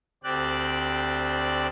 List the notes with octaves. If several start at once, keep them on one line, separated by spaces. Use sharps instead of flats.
D2 C4 G4 D5 F#6